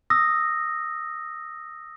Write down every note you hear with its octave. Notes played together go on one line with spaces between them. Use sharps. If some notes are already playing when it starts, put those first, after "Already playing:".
D#6 E6 A#6